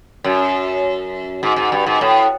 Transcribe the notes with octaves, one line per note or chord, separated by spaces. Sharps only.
F#2
G#2
G#2
G2
G#2
A2